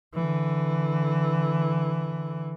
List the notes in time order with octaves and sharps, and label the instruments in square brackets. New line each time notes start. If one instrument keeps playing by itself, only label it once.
[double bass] D3 E3